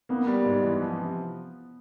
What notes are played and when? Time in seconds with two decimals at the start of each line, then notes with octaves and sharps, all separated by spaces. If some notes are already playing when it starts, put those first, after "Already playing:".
0.09 A#3 B3
0.27 G3
0.45 G#2
0.63 E3
0.81 F3
0.99 C3